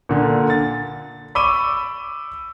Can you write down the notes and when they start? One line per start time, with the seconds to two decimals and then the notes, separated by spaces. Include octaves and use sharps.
0.09 A#2 D3
0.50 A6
1.35 B5 C#6 D6 E6 D#7 G7